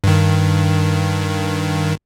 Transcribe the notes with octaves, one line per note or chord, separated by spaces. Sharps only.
G2 D#3